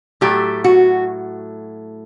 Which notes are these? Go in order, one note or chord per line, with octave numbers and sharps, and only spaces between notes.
A2 F#3 A3 G4
F#4